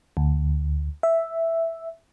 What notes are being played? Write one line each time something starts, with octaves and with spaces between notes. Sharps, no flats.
D2
E5